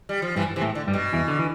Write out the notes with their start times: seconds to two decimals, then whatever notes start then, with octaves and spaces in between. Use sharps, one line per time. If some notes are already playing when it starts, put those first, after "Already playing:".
0.09 G3
0.22 F3
0.36 G2 C3 E3 G3
0.56 C3 E3
0.61 A2 A3
0.75 D3
0.87 G2 G3
0.93 B2
1.13 E2 E3
1.28 D3
1.39 E3